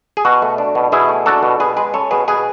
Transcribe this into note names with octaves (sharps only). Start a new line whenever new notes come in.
G#4
B2 F#4
A3
D4
B2
B2 E4 G#4
A3
D4 F#4 A4
B2
B2 G#4 B4
G#3 G#4 B4
C#4 A4 C#5
B2 G#4 B4
B2 G#4 B4